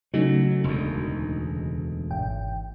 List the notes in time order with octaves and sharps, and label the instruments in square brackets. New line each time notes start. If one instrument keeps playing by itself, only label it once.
[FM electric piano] C#3 A3 D#4 [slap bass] F#3
[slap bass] E1 D2
[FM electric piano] G#1 G5